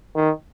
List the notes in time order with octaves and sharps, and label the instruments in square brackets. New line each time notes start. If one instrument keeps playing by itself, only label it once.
[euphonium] D#3